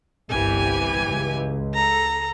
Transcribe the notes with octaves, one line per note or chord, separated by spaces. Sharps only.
G1 C2 E3 G4 G#5
C#2
A4 A#5